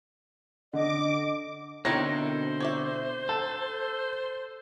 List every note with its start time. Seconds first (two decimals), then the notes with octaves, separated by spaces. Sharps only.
0.73 D3 D#5 D6
1.85 B2 D3 D#3 C4 E4 C5 C#5 A#6
2.60 C#5 D5 E5
3.29 A4 A5